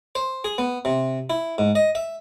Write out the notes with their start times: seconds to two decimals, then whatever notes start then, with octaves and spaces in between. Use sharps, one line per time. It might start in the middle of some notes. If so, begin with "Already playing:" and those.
0.15 C5
0.44 G#4
0.58 B3
0.85 C3
1.30 E4
1.58 G#2
1.75 D#5
1.95 E5